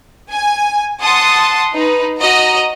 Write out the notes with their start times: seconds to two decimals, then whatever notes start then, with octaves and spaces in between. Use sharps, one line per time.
0.31 G#5
1.01 F#5 A5 C6 D#6
1.73 D#4 B4
2.20 F#4 D#5 A#5